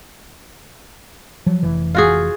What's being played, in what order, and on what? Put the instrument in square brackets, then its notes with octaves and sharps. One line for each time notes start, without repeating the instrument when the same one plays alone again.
[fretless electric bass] F3 F#3
F1 E3
[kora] F4 F#4 G#4